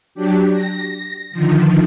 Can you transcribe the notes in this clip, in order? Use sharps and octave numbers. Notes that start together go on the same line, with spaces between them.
F#3 D4 G4
A#6
D3 D#3 F3